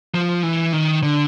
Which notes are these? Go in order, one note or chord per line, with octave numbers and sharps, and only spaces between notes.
F3
E3
D#3
D3